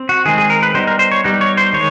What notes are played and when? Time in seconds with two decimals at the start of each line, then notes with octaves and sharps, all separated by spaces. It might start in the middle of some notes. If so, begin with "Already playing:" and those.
Already playing: C4
0.09 F#4
0.25 D#3 G#3 C4 G#4
0.38 G#4
0.50 A#4
0.63 B4
0.75 G3 B3 D#4 C5
0.87 A#4
0.99 C5
1.12 C#5
1.24 G3 B3 D#4
1.41 C#5
1.57 C5
1.73 D#3 G#3 C#5